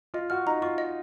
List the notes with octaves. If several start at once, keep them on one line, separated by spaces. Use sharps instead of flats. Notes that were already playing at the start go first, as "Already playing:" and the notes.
F4 D#5
F#4 F6
D#4 A#5
F4 C#6
D#5